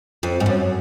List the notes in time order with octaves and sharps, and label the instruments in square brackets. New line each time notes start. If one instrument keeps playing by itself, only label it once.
[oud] F2
G#2
F#2